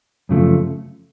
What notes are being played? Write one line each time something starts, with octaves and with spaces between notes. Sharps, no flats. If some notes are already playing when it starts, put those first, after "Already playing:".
F#2 C#3 F3 A3